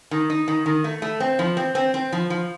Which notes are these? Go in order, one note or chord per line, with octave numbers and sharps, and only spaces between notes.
D#3
D#4
D#3
D#3
A3
A3
C4
F3
C4
C4
C4
F3
F3